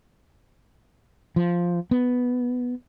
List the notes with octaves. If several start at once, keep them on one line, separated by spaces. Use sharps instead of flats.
F3
B3